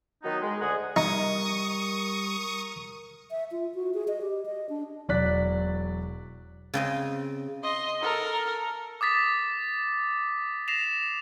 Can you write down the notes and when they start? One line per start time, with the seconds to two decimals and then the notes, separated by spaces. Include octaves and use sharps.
0.23 D#3 F#3 B3 D#4
0.41 G#3
0.61 D2 D3 G#4 F#5 D#6
0.96 G3 D#4 A#4 C#6 D#6
3.31 E5
3.52 F4
3.74 F#4
3.94 G#4
4.08 D#5
4.21 G4
4.46 D#5
4.69 D4
5.09 E1 F#3 D5 F#6 B6
6.74 C#3 C4 D#5
7.63 D#5 C6
8.02 A4 A#4
9.01 D6 D#6 A6 B6
10.68 A#6 C7 E7 F7